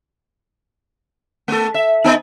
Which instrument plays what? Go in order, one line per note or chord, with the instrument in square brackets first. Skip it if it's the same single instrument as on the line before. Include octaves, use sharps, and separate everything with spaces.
[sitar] A3 A4
E5
B3 D#4